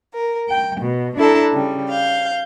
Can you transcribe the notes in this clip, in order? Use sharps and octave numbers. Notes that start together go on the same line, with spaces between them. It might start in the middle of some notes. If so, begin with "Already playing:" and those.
A#4
G5
B2
D4 E4 A4 A5 A#5
C#3 G3
F5 G6